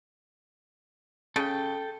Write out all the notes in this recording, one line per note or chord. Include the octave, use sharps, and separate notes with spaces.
C#3 A4 G5